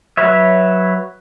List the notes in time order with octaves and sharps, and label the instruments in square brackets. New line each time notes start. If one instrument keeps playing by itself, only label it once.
[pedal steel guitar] F#3 B4 C#5 E5